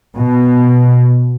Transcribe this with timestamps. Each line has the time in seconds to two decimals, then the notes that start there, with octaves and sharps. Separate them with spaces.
0.16 B2